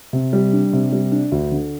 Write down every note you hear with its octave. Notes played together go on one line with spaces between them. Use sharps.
C3
G3
D4
C3
G3
D4
D2
D3